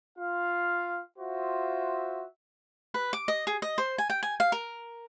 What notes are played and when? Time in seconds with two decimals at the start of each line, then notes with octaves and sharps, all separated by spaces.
0.18 F4 F5
1.19 F4 F#4 C5 E5
2.94 B4
3.13 D6
3.28 D#5
3.47 G#4
3.62 D#5
3.78 C5
3.98 G#5
4.10 G5
4.23 G#5
4.40 F5
4.52 A#4